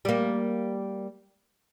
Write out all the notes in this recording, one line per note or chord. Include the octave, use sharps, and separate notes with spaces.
G3 A#3